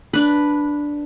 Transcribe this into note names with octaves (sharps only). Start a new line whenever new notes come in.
D4 B4